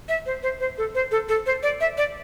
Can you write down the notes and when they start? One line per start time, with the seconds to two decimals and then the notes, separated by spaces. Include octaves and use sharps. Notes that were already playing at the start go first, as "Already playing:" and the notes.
0.09 E5
0.26 C5
0.43 C5
0.60 C5
0.78 A4
0.95 C5
1.11 A4
1.29 A4
1.46 C5
1.63 D5
1.81 E5
1.98 D5